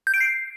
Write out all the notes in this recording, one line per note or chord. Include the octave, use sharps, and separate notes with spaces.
G6
D7
C7